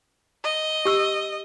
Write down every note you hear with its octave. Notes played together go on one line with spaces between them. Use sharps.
D#5
G4 E6